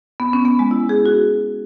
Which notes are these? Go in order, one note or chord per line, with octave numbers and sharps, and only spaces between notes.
B3
C#4
B3
G#3
E4
G#4
F#4